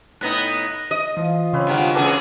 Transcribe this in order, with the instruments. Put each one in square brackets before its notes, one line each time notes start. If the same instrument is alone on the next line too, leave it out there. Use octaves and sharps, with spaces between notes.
[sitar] A2 B3 D#4 [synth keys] F#6 A#6
[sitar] D#5
[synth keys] E3 [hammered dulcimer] F3
[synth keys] C#3 [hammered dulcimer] C4 C#4 B4
[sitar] G2 D#3 G#3 [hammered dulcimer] F4 F#4 A#4
[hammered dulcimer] G#2 E3 F#5 [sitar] C#3 G#4 A4 [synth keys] B4 D6